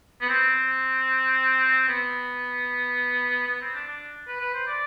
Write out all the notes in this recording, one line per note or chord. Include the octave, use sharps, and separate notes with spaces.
B3
C4
B3
B3
C4
D4
D4
B4
B4
C5
D5